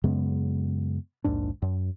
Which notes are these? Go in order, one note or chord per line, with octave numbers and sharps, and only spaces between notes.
F#2 C#3 G#3 B3
A#1 D#2 G#2 D4
F#2